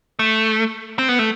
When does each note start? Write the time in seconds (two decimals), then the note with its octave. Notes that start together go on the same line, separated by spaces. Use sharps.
0.19 A3
0.99 C4
1.09 B3
1.19 A3